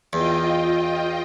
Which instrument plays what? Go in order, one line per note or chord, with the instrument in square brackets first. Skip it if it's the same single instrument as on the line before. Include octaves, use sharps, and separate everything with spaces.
[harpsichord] E2 [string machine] F4 D#5 G5